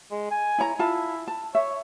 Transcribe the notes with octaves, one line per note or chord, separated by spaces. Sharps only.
G#3
G#5
E4 C#5 A#5
E4 F4 A5
A5
C#5 E5